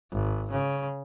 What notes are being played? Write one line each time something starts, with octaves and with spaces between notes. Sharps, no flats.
G#1
C#3